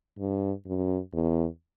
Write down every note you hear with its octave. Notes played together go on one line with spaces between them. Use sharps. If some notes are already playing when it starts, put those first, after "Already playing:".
G2
F#2
E2